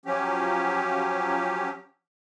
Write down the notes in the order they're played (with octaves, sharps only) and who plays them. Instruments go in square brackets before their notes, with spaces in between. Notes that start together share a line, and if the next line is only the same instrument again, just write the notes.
[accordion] F3 F#3 C#4 G4